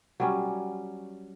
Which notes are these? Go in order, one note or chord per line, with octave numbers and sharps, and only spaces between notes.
F#3 G3 C#4